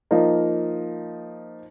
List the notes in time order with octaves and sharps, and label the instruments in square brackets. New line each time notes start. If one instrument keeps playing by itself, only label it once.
[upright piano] F3 A#3 D#4